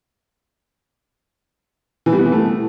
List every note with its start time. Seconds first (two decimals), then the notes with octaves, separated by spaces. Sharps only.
2.06 E3
2.13 G3
2.19 B3
2.26 E3
2.32 A3